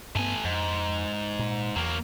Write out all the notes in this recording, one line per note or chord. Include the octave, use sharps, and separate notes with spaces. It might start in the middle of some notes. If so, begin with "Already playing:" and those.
G2 A3 B3 G#5
F2 G#2
A#2
E2 F#3 A#3